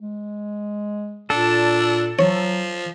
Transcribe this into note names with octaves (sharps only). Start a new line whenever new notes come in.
G#3
A#2 D4 A4
F3 F#3 C#5